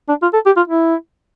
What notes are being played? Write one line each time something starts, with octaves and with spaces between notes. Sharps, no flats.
D4
F4
A4
G4
F4
E4